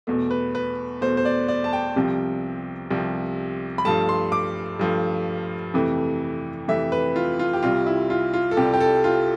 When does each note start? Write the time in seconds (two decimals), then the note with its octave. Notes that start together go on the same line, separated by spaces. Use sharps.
0.07 E2 B2 A3
0.31 B4
0.55 B4
1.01 E2 B2 A3 C5
1.17 C5
1.25 D5
1.48 D5
1.64 A5
1.73 G5
1.96 C2 C3 F3
2.90 C2 C3 F3
3.78 B5
3.85 G2 F3 A3 A5
4.09 C6
4.32 D6
4.79 G2 F3 A3
5.74 F2 C3 E3 A3
6.68 F2 C3 E3 A3 E5
6.92 B4
7.16 F4
7.39 F4
7.53 G4
7.63 C2 C3 G3 F4
7.86 E4
8.10 F4
8.34 F4
8.51 A4
8.57 C2 C3 G3 G4
8.74 G4
8.80 A4
9.04 F4